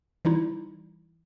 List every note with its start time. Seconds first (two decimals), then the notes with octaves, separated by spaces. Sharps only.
0.25 E3 G3 D#4 E4